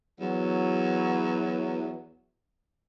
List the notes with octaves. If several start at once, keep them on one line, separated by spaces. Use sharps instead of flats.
E2 F#3